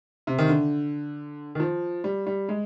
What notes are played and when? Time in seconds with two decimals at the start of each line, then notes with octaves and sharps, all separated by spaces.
0.27 C3
0.39 D#3
0.49 D3
1.55 D#3
1.60 F3
2.04 G3
2.27 G3
2.49 G#3